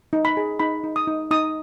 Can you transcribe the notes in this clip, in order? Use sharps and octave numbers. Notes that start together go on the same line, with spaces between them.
D#4
B5
G#4
D#4 B5
D#4
D#6
D#4
D#4 D#6